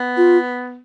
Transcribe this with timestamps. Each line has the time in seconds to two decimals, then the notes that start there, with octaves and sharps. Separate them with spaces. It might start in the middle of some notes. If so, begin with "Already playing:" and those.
Already playing: B3
0.17 F4